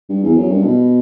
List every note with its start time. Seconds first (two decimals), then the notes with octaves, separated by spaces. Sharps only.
0.09 G2
0.23 E2
0.37 F#2
0.50 G2
0.64 B2